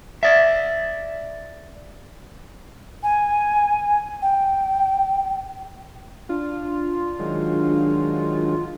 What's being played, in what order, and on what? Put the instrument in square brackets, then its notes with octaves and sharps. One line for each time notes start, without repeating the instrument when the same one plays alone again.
[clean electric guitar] D5 E5
[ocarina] G#5
G5
[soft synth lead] D4 [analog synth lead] F4
[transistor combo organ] D#3 F#3 G#3